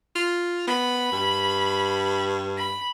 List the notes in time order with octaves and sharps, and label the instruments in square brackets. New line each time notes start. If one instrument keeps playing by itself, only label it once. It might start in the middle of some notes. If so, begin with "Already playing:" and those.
[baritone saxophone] F4
[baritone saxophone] B3 [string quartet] B5
[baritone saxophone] G2
[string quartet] B5